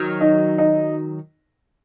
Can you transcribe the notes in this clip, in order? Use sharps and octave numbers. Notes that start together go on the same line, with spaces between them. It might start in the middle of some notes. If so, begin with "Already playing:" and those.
Already playing: D#3 F#3
D#4
D#4